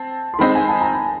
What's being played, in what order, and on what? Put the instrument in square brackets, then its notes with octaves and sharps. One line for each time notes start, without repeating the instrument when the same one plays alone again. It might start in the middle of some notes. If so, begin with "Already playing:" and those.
Already playing: [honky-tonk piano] C4 [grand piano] A5
[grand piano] C6
[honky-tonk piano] D#3 G#3 C4 D#4 [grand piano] B5
[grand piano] G#5
A5
A#5
B5